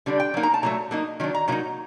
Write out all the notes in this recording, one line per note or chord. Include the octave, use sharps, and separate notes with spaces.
D3 G3 D4
G5
F#3 A#3 D#4
A#5
A5
A#2 F#3 A3 A#5
F#3 A#3 D#4
D#3 F#3 D4
A#5
A2 F#3 A#3 D#4 A#5